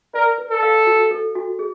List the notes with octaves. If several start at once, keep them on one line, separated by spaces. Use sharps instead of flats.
A#4 D5
B4
A4
F5
F#4
A4
F#4
G#4